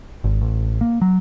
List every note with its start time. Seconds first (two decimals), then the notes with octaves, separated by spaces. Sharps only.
0.24 G#1
0.41 A1
0.81 A#3
1.02 F#3